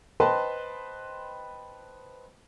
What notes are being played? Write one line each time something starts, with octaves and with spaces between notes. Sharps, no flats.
B4 C5 D#5 G5 A5 C6